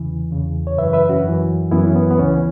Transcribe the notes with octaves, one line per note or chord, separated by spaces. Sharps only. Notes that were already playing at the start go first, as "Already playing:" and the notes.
Already playing: E2 C#3 E3
E2 C#3 E3
C#5
F#2 C#3 E3 B4 E5
B4 E5
C#4 F#4
F#2 E3
F#2 E3 B3 E4
C#4
B3
B3
C#2 C#3 E3 C#4